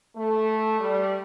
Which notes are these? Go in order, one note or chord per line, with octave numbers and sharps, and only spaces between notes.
A3
G3